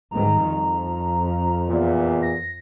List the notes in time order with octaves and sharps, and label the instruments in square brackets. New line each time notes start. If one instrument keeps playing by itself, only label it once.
[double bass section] G#2 D#3 G3 [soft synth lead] A#5
[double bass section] F2
[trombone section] E2 A#2
[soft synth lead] A#6